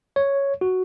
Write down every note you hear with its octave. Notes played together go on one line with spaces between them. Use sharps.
C#5
F#4